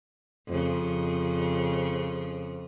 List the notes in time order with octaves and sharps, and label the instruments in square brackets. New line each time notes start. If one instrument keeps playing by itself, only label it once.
[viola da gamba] F2 C#3